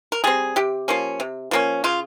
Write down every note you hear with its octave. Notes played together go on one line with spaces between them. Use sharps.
A#4
G3 C4 G#4
C3 G4
F3 A#3 C#4
C3
F3 A#3 C#4
C#3 F4